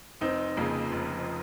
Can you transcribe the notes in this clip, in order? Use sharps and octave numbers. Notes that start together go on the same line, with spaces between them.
F1 C4 D#4
F2 C#3 A#3
F1